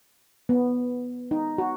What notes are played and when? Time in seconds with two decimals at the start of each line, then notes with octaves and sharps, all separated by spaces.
0.49 B3
1.31 D#4
1.58 F#4